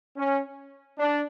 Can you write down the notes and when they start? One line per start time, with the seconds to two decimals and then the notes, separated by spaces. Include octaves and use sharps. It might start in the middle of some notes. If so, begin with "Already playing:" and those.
0.16 C#4
0.98 D4